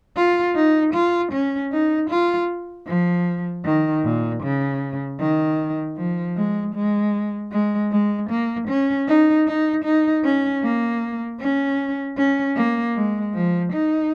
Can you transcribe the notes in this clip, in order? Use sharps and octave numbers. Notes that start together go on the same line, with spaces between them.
F4
D#4
F4
C#4
D#4
F4
F3
D#3
A#2
C#3
D#3
F3
G#3
G#3
G#3
G#3
A#3
C#4
D#4
D#4
D#4
C#4
A#3
C#4
C#4
A#3
G#3
F3
D#4